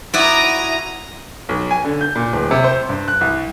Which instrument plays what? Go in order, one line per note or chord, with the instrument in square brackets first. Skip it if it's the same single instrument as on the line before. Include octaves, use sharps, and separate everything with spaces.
[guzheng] E4 F#4 D5 [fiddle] A#5 D#6
[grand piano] B1
G#5
D3
G6
A#2
D1
C3
C5
G2
F#6
C2